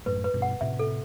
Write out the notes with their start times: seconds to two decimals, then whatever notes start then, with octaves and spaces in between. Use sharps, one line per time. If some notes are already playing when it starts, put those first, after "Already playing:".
0.06 F#2 A2 B4
0.24 B4
0.34 G2 B2
0.42 F#5
0.61 A2 C3 E5
0.79 A4